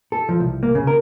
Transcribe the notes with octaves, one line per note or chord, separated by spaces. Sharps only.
A4
F3
C2
A#3
C#3
A#4